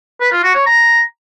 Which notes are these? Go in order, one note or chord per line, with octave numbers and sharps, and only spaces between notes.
B4
F4
F#4
C#5
A#5